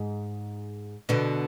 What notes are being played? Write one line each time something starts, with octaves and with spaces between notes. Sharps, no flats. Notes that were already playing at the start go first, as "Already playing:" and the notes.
Already playing: G#2
B2 D3